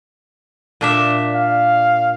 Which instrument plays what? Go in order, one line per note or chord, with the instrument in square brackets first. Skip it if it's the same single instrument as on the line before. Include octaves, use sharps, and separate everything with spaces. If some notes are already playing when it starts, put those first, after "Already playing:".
[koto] A#2 D4 E5
[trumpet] F5